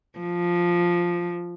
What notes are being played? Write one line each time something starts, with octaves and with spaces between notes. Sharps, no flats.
F3